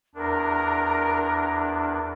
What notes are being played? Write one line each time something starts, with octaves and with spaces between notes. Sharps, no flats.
E2 D4 A#4